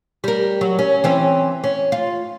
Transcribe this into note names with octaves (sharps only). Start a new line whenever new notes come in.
G3 A#4
F#3
C#4
E3 C4 C#4
C#4
F4